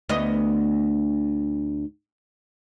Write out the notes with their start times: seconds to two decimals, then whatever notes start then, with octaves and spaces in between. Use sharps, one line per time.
0.09 D2 B3 D#5